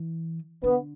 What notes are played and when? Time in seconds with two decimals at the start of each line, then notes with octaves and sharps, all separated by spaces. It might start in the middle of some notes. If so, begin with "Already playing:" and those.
Already playing: E3
0.63 D3 B3